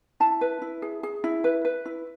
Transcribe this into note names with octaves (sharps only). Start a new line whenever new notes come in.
E4 A5
B4
E4
G#4
G#4
E4
B4
B4
E4